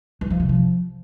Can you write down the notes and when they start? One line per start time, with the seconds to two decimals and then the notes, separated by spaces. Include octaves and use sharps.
0.21 E3
0.30 F3
0.40 C3
0.49 F3